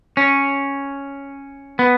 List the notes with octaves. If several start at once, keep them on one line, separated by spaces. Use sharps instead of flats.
C#4
B3